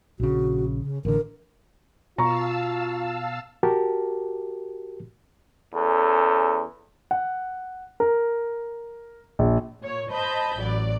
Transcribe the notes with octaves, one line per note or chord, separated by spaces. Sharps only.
A#1 C#3 F#4
C#3
A1 D3 A#4
B2 F4 F5 A5 A#5 C#6 E6
F#4 G4 A#4 A5
E2 C#4 A4
F#5
A#4
A#1
A#2 C#5
C5 D#5 A5 B5 G6
A1 F#3 D5